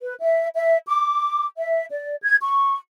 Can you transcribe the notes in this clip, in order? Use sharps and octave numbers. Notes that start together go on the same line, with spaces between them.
B4
E5
E5
D6
E5
D5
G#6
C#6